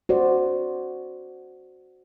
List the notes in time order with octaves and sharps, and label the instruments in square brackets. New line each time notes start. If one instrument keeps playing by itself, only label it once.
[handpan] F#4 C5 D5